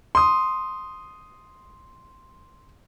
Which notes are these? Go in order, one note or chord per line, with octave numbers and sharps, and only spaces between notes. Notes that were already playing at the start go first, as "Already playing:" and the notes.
C6 D#6